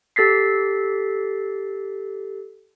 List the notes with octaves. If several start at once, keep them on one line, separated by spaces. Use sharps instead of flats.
G4 A4 A6 B6 C7